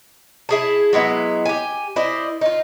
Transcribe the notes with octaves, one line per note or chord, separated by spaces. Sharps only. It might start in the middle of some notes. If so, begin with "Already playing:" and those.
E4 G#4 A5
F#3 G#3 B3 E4
G4 G#5
E4 C5 D5 D#5
D#4 F4